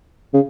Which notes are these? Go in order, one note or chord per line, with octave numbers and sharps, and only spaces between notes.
C#3